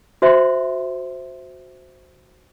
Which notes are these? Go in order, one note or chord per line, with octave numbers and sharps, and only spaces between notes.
F#4 C5 E5 C6